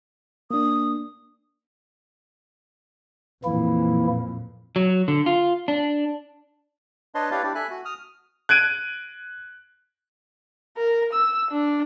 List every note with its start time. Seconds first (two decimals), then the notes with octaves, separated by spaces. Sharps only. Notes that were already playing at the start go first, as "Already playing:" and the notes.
0.51 A#3 D4 D#6
3.44 F2 A#2 E3 A#3 E4
4.76 F#3
5.08 D3
5.26 F4
5.68 D4
7.15 D4 B4 C#5 D#5 A5 C6
7.31 E4 G4 B4 C#5 D5 F5
7.43 D4 E4 G4
7.55 A4 E5 G#5 F#6
7.71 F#4
7.85 D#6 F6
8.49 F#6 G#6 D7 D#7
10.77 A#4
11.13 E6
11.51 D4